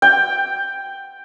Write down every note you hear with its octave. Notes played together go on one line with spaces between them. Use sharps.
G5